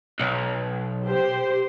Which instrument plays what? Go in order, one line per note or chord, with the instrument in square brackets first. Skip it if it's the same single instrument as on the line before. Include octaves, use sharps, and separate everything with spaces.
[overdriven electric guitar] B1
[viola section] G4 C5